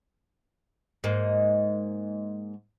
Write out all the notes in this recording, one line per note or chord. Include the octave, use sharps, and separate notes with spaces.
G#2 A#3